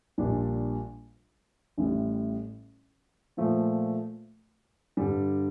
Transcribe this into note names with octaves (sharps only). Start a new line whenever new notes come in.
A#1 A#2 G3 D4
A1 A2 G3
A#2 F3 A3
G2 D3 G3